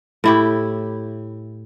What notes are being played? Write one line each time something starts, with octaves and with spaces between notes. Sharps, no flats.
A2 E4 G4